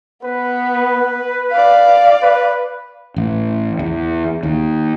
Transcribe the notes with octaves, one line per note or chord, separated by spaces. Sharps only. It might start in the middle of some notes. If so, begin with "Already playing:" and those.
B3 B4
D5 F5
B4
A1
E2
D#2